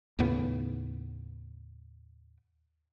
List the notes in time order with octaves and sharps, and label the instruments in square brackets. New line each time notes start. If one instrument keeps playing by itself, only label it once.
[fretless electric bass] D#2 A2 C#3 B3